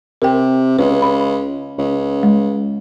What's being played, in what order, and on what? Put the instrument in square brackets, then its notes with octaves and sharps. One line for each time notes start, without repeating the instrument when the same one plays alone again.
[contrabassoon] C3 [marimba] A#4 G5
[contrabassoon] C#2 [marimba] B4
[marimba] B5
[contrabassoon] C#2
[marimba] G#3